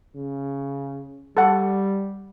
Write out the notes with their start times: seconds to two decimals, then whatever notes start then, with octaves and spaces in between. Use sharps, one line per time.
0.15 C#3
1.37 G3 A4 F#5